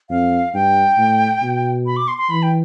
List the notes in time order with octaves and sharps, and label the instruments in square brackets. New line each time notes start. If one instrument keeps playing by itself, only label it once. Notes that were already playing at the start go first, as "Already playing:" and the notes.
[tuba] F2 [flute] F5
[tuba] G2 [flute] G5
[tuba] A2
B2
[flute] B5
D6
C6
C6
[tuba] E3 [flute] B5
[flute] G5